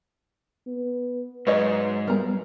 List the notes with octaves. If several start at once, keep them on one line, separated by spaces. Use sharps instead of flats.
B3
G#2 F#3 B4 C#5 D#5
G3 B3 A#4 A#5